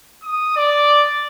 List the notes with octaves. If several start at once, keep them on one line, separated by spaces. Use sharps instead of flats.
D#6
D5